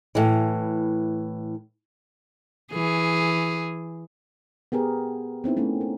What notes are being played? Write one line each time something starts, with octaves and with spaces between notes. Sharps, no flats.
A2 E3
E3 G#4
B3 G4 G#4 A#4
B3 C4 D#4 E4
A3 A#3 C#4
A#4